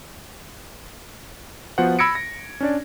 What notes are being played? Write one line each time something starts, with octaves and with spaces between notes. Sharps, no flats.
F3 B3 F4 F#4 C5 F#5
B5 E6 G#6 A#6 C#7 D7
A#6
C#4 D4 D5